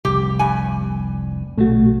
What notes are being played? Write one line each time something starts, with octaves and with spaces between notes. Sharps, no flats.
F1 C2 G4
G2 G#5
B1 A#2 C#3 A3 F#4